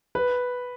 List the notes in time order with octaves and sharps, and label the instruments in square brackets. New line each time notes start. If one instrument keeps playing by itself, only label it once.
[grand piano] B4